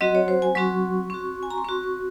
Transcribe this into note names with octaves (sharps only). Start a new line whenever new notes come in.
F#3 C4 F#4 D#5
C#5
C5
G#5
F#3 C4 F#4 C#6
C4 F#4 C#6
G#5
A#5
C6
C4 F#4 C#6
C#6